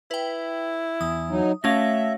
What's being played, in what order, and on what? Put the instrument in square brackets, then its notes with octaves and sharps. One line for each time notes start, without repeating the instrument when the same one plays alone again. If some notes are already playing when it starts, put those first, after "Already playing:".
[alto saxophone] E4 [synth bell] B4 G5
[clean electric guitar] E2 [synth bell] D#6
[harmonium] F#3 D#4
[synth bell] A3 C#4 A#6 [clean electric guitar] F#4 C#5 F5 [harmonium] E5